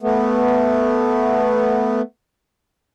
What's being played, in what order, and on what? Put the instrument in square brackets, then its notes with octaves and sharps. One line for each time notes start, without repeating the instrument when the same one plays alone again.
[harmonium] A3 B3